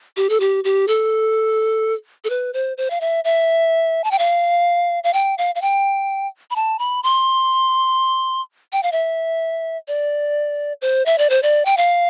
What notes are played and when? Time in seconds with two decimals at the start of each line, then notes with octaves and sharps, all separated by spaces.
0.17 G4
0.29 A4
0.40 G4
0.64 G4
0.88 A4
2.24 A4
2.30 B4
2.54 C5
2.77 C5
2.90 F5
3.01 E5
3.24 E5
4.04 A5
4.11 G5
4.19 F5
5.04 F5
5.13 G5
5.38 F5
5.55 F5
5.62 G5
6.51 B5
6.56 A5
6.79 B5
7.03 C6
8.72 G5
8.83 F5
8.92 E5
9.88 D5
10.82 C5
11.06 E5
11.18 D5
11.30 C5
11.43 D5
11.65 G5
11.77 F5